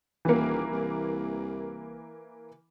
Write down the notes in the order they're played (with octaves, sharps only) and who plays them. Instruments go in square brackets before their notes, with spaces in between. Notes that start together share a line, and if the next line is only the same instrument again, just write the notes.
[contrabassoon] D#1 [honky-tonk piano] E3 A#3
[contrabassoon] C2